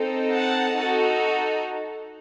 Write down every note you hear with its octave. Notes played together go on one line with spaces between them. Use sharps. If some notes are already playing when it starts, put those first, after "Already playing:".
Already playing: C4 D#4 A4
F#5 A5
D#4 F#4 A4